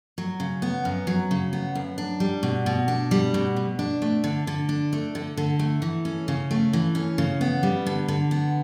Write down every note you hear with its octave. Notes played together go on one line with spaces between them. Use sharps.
F#3
C#3
B3
F#2
F#3
C#3
B3
F#2
D4
G3
B2
B2
D4
G3
B2
B2
D4
A3
D3
D3
D4
A3
D3
D3
A3
E3
C#4
C#3
A3
E3
C#4
C#3
B3
G3
D3
D3
B3